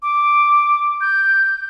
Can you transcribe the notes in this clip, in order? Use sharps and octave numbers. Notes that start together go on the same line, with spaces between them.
D6
G6